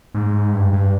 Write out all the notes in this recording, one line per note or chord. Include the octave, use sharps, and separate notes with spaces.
G#2
G2
G2